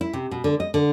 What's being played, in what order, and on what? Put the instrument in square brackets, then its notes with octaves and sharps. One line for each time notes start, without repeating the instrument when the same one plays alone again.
[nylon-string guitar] E4
C3
B2
D3
D#5
D3